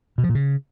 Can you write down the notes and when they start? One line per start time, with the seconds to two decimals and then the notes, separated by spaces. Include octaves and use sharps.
0.18 B2
0.24 F3
0.29 A#2
0.35 C#3